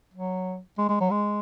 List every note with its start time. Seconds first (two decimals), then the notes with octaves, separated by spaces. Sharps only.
0.14 F#3
0.78 G#3
0.89 G#3
1.01 F#3
1.11 G#3